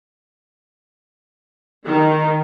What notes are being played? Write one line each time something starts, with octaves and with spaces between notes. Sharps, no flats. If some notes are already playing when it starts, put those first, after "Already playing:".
D#3